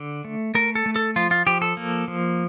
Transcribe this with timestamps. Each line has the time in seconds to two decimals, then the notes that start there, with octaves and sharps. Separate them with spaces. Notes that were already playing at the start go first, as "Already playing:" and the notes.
Already playing: D3
0.25 A3
0.55 A3 A#4
0.75 A4
0.86 A3
0.96 A4
1.16 F3 F4
1.31 F4
1.47 F3 G4
1.62 A4
1.77 A#3
2.08 F3